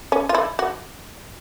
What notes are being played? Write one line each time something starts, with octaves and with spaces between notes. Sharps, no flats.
C#4
F4
E4
F#4